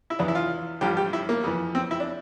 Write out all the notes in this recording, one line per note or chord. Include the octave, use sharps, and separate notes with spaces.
E4
E2 E3 D4
E4
F4
A1 G2 F3 G4
G4
E4
A#3
F2 E3
C4
E4
D4